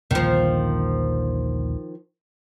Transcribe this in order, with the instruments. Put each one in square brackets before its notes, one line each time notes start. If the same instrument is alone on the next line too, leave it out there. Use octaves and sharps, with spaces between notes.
[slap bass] A#1 D#2 D3 [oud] D#3 F3